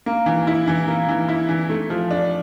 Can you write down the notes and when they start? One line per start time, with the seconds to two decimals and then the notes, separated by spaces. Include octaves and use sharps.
0.06 A#3
0.26 E3
0.47 E4
0.68 E3
0.87 A#3
1.09 E3
1.28 E4
1.49 E3
1.70 A3
1.90 F3
2.11 D4